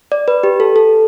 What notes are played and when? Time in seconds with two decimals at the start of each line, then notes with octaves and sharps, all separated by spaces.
0.12 D5
0.28 B4
0.43 G4
0.60 A4
0.76 A4